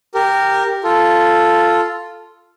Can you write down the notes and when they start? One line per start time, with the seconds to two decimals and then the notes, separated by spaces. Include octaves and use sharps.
0.15 G4 A#4
0.84 F4 A4